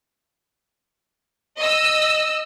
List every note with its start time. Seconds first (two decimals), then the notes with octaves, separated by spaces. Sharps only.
1.58 D#5 E6